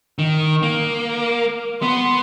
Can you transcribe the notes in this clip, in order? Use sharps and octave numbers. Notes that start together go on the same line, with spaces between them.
D#3
A#3
B3 C6